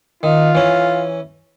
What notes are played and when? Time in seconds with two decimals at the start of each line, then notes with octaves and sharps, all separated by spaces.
0.23 D#3 F4
0.55 E3 C#4